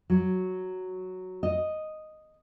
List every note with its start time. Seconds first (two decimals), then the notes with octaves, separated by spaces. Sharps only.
0.10 F#3
1.43 D#5